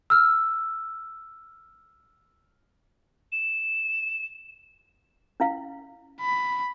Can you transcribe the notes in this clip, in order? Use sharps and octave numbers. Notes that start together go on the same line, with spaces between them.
E6 F6
E7
C#4 E4 F5
B5